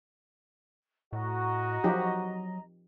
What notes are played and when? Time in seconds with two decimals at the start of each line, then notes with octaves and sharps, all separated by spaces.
1.13 A2 F#4 D#5 A#5
1.84 F3 F#3 D#4 G4